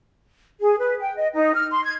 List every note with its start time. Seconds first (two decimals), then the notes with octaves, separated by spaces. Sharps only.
0.61 G#4
0.79 B4
1.00 G5
1.16 D#5
1.33 D#4
1.55 F6
1.71 C6
1.85 G#6